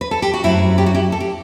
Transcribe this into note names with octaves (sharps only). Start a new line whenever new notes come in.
B4
A4
G4
F#4
F#2 F#3 A3 C4 E4
G4
F#4
E4 G4
A4
G4